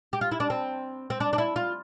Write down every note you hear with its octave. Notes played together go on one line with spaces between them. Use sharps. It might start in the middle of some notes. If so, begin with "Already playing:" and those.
G4
F4
E4
D4
C4
C4
D4
D4
E4
F4